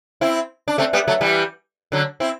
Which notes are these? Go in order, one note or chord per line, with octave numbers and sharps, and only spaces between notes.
C4 E4
D4
A3 C4
G3 B3
F#3 A3
E3 G3
D3 F#3
C4 E4